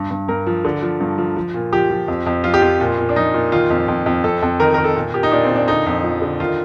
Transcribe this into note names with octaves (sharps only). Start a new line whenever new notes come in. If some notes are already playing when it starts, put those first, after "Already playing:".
Already playing: G2
G2
G2 A#4
F3
D3
F3
G2
F3
F3
A#2
F3 G4
F3
F2
F2
F3 F4
G4
F2 F4
A#2
A#2
D4
F3 D#4
A#2
D#3 F4
F2
F2
F2
F2 A4
F2
D#3 A#4
D#3 A#4
A4
A#2
A#2 G4
D#4
A#2 D4
C4
A#2
D4
D3 D#4
F2
F3
D3
D#3 F4